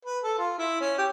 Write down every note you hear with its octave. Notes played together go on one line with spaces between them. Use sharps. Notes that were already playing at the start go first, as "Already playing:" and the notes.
B4
A4
F4
E4
C#4
G4